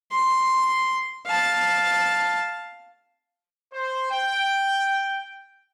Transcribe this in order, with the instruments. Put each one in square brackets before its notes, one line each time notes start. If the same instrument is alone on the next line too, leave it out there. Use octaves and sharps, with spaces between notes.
[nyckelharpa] C6
F5 A5
[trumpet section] C5
G5